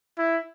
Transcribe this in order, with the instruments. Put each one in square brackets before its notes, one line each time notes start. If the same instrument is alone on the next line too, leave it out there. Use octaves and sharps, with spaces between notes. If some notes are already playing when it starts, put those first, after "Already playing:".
[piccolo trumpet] E4